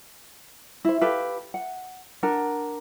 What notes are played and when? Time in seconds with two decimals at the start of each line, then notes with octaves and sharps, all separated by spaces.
0.85 E4 C5
1.01 G4 A4 B4 F5
1.54 F#5
2.23 D4 A#4 F#5